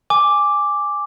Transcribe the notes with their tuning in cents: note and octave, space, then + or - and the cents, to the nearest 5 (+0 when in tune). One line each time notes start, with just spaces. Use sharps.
G#5 -10 D6 +0